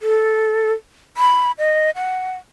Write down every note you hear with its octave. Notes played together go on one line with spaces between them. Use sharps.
A4
B5
D#5
F#5